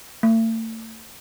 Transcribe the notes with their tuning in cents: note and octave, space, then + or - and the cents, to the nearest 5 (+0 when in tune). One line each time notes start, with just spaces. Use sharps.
A3 +40